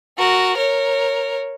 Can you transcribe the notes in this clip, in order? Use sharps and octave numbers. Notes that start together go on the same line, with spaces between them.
F#4 A#4
A#4 C#5